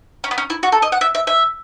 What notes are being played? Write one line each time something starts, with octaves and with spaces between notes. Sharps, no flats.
C#4
B3
C#4
E4
F#4
A4
D#5
F#5
E5
E5
E5